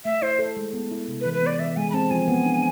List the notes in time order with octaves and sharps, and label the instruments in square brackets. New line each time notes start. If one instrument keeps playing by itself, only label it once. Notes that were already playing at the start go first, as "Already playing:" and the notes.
[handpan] A3 [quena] E5
[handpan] E4 [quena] C5
[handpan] A4
G#3
B3
E4
C3
[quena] B4
[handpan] E3
[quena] B4
[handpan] B3 [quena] D5
[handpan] E3 [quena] E5
[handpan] G#3 [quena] G#5
[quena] B5
[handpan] C4 [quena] A5
[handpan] F3 [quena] G#5
[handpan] B3
D4